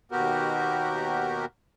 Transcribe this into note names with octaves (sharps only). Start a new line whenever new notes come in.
D#2 B2 B3 F#4 G4 A#4